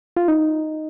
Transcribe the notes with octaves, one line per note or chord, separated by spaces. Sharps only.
F4
D#4